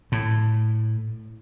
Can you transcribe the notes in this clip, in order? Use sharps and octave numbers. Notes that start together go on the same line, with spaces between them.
A2